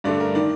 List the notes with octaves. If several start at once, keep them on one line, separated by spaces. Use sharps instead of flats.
G2 D3 A3 D5
A#4
D#3 D5